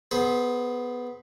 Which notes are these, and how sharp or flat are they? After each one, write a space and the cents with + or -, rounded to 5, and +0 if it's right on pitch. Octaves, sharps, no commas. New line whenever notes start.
B3 +0 G#4 +30 C5 +0